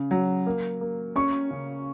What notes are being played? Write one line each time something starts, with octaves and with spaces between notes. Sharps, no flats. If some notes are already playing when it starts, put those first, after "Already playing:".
Already playing: C#3
F#3
A#3
A#3
C#4 C#6
C#3